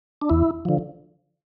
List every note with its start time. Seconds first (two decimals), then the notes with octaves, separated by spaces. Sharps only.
0.22 D4
0.30 E2 E4
0.65 D3 F3